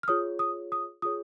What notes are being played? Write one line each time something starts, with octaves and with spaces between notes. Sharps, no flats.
F6
F4 G#4 C#5 D#6
D#6
D#6
F4 G#4 C#5 D#6